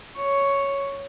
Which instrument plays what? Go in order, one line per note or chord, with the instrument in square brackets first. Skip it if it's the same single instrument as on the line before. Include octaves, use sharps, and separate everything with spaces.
[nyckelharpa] C#5